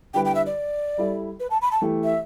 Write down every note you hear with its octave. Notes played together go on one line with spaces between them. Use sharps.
D3 G3 E4 B4 G5
G5
E5
D5
G3 E4 A4 E5
B4
A5
B5
A5
E3 A3 G4
E5